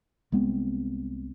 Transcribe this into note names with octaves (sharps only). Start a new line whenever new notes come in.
C2 G#3 B3 C4